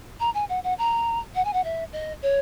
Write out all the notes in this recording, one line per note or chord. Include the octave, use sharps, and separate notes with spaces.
A#5
G#5
F#5
F#5
A#5
F#5
G#5
F#5
E5
D#5
C#5